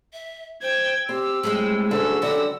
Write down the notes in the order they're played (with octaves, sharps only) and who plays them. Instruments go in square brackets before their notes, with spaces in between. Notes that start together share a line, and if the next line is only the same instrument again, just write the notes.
[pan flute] E5
[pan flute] C5 [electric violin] G5 G#6
[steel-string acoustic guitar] C4 [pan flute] G4 [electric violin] E6
[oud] A2 G3 G#3 [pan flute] G#4
[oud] D2 [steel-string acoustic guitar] D3 F#3 C#4 [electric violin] E6
[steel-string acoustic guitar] F#2 D3 G3 [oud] F#4 [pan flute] F#5